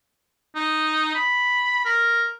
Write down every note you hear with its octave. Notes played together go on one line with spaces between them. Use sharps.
D#4
B5
A#4